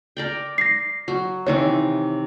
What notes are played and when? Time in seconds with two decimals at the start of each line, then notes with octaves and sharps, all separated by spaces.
0.17 A#4 D5 G5
0.58 A#6 C7
1.08 F#3
1.47 C3 D#3 E3 C#5